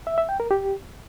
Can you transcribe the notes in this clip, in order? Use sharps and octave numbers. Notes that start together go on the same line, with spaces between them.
E5
E5
G5
A#4
G4